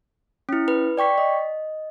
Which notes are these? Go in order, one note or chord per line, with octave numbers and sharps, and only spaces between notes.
C#4 E4
B4
D5 G5 C#6 B6
D#5